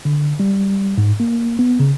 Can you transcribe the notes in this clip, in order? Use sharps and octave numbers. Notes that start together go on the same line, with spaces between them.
D3
G3
G#2
A#3
B3
C#3